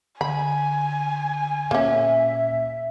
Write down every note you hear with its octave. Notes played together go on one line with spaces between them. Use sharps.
D3 G#5 B5
A#2 A#3 C#4 E5